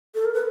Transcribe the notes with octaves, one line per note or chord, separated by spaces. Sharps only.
A4
A#4
B4